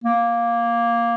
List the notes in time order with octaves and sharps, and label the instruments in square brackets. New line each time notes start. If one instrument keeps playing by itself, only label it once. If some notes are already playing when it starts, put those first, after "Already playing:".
[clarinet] A#3